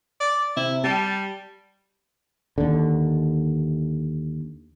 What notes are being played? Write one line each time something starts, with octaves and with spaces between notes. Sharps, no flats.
D5
C3 E4
G3 A5
D#2 D3